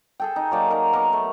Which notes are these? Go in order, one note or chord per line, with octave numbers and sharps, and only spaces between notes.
G#4 A4 G5
D#4
F#3 A#3 D5
D#4 A#4
B3 A#4 F#5 D6
A3